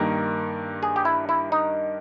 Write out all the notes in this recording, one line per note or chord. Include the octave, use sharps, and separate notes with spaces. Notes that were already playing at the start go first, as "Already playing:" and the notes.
Already playing: G2 D#3 A#3 A#4
G#4
G4
E4
E4
D#4